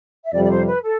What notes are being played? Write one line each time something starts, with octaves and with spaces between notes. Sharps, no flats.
E5
F2 C3 G3 D5
D5
C5
B4
A4